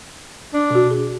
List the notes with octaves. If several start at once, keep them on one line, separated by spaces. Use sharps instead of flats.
D4
B2 F#4
G#4